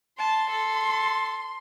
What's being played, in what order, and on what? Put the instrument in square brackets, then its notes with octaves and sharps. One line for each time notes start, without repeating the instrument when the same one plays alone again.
[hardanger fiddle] A5 [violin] C6
[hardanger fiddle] A4